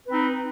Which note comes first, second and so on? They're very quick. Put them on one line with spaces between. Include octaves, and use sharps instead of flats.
B4 C4 D#4